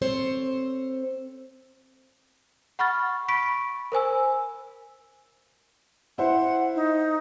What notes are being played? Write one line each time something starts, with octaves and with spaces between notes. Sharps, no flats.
C4 A4 C5 C#5
F#5 B5 C#6 F6 A6
B5 C#6 B6 D7
A#4 C5 G#5 E6
E4 C5 F#5
D#4